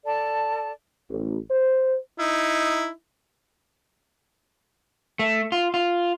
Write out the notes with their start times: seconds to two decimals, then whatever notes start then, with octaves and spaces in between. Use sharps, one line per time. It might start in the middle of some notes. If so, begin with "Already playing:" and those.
0.05 A4 D5 A5
1.10 A1
1.50 C5
2.19 D#4 E4
5.19 A3
5.52 F4
5.74 F4